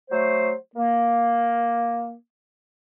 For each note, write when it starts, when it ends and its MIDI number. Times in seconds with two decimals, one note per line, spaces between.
0.11 0.54 54
0.11 0.54 57
0.11 0.54 72
0.76 2.14 58